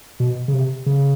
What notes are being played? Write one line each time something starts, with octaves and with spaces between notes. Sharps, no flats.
B2
C#3
C3
C#3